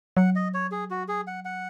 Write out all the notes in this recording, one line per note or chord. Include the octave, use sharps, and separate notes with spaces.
F#3 F#5
D#5
C#5
G#4
F#4
G#4
F#5
F#5